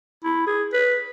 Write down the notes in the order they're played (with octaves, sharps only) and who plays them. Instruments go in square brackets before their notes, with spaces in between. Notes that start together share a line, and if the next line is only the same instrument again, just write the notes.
[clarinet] E4
G#4
B4